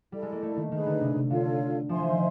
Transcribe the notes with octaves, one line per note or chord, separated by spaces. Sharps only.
G3 E4 A4 D5
G#3
A#3
A3
D#3
D#3 D#4 G#4 B4
D3
C3
C3
D3 F4 A4 C#5 F5
F3 C5 E5 G#5 C6
E3
D#3